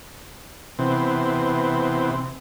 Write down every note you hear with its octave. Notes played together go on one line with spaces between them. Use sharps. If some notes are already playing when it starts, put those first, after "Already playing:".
C3 E3 B3 C4